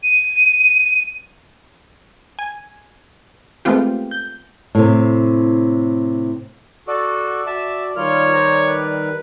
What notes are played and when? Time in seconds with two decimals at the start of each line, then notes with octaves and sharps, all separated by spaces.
0.03 D#7
2.39 G#5
3.65 G#3 A3 B3 C4 F4 G4
4.11 G6
4.75 A2 C3
6.88 F#4 A4 D5
7.46 F#4 E5 A5
7.96 D#3 G3 F4 A#4 C#5 F6
8.33 C5 A#5
8.67 B4